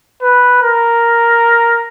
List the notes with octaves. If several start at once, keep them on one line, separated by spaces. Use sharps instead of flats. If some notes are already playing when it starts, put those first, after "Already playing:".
B4
A#4